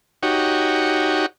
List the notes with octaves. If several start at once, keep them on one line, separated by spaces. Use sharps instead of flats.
D#4 F#4 G4 C#5